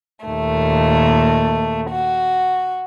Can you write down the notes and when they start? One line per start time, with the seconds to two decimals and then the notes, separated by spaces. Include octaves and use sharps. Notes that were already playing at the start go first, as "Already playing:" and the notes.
0.25 D#2 A#2 A3
1.90 F#4